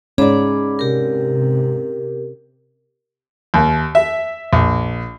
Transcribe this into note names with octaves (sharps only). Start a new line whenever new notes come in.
G#2 C#4 G#4 D5 B5 D6
C3 G4 A#4
D#2
E5
A#1